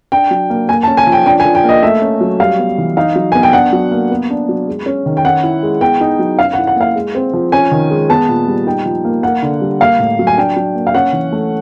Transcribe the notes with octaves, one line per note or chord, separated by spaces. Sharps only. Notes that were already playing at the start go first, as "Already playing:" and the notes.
D4 G5
F#3
A#3
A#3 G#5
A5
C#4
G#5
F3
G5
D4 G5
G#5
F3
G5
A#3 D#5
A3 E5
C#4
F#3
G3 F5
B3
E3
D#4 F5
F#3
B3 G#5
G5
D4 F#5
F#3
A#3
B3
D4
F#3
G#3
C#4
D#3
G5
C#4 F#5
E4
G#3
B3 G5
D#4
F#3
C#4 F5
F#5
E4
F#5
A#3 F5
G#3
C4
F3
C#4 G#5
D#3
G#3
B3 A5
A#2
G3
D#4 G5
F3
A#3
A#3 F#5
D3
G3
A#3 F5
A2
F#3
G#5
D4 G5
F#3
A#3
F5
C#4 F#5
E3
A3